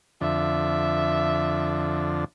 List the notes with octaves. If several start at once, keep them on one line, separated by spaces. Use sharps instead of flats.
F2 D3 E5